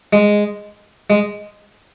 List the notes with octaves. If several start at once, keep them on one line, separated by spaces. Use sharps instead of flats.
G#3
G#3